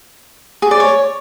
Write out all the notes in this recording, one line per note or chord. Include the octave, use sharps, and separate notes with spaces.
G#4
D5
C#5